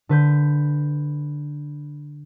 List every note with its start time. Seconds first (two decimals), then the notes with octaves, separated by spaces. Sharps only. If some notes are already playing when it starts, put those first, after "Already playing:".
0.09 D3 B4 G6